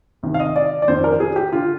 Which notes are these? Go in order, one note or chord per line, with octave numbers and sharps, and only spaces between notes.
C2 C3 D#3
F5
D#5
D5
D5
F2 D#3 C5
A#4
G#4
G4
D3 F4